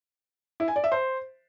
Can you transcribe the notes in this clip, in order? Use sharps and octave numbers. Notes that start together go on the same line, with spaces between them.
E4
G#5
D5
E5
C5